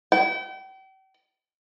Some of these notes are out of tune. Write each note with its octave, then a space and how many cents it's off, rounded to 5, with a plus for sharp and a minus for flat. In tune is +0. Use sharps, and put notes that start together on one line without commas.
G5 -40